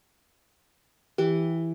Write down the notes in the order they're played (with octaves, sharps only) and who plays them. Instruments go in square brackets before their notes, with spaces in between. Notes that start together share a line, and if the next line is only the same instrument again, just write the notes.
[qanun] E3 [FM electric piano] G4